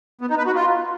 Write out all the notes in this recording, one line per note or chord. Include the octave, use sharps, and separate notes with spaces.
B3
D#4
B4
F#4
F4